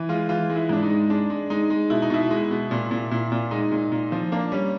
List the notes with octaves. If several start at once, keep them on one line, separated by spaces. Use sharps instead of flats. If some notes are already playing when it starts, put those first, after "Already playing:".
Already playing: E3
G#3 F4
E3 F4
G#3
E4
G#2 D4
D#4
G#3
G#3 D4
G#3
G#3 D#4
G#3
B2 E4
D#4
B2 E4
G#3
B2
A#2
A#2
A#2
A#2
G#3 D#4
A#2
A#2
F3
A#3 D4
G3 C#4